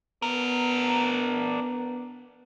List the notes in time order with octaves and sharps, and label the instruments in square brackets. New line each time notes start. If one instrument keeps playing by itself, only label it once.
[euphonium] B3 [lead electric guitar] D4 A#4